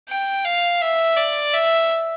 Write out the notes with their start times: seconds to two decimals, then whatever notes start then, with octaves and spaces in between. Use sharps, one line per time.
0.09 G5
0.45 F5
0.82 E5
1.16 D5
1.53 E5